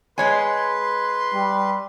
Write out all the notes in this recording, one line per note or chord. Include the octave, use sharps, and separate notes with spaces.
G#3 B4 C#5 G#5 C6
G3